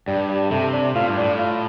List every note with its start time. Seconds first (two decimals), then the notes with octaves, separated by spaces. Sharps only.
0.07 G2 G3
0.29 G3
0.51 C3 A3
0.73 D4
0.95 A2 F4
1.07 G2
1.17 A2 D4
1.38 F4